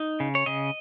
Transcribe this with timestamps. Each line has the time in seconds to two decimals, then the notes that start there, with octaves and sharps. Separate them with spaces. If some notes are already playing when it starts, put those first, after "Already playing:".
Already playing: D#4
0.20 C#3
0.35 C#5
0.46 C#3 D#5